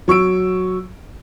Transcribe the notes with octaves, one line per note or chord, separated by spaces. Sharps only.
F#3 C#6 E6 D7